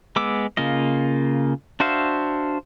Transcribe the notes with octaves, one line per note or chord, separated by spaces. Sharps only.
G#3 B3 D6 E6
C#3 A#3 F4 D#5
D4 F#4 C5 E5 F5